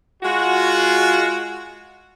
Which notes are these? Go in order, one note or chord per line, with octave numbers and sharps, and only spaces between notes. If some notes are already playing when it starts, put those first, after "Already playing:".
G#3 F4 F#4